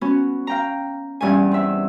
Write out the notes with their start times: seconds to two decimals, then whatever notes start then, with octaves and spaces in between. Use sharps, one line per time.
0.01 B3 C#4 F#4
0.47 F5 G5 A#5
1.21 E2 G2 C#4 G#5
1.51 C4 E5